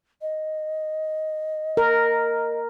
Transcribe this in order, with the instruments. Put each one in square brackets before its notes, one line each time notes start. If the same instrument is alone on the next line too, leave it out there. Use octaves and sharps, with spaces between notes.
[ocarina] D#5
[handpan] A#4